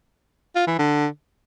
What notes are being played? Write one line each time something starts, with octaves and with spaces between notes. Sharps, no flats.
F4
E3
D3